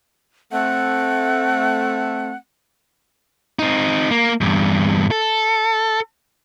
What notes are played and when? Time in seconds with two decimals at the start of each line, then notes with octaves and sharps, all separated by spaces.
0.52 A3 C4 F#5
3.59 C4 D#4
4.11 A#3
4.41 E2 G2
5.11 A4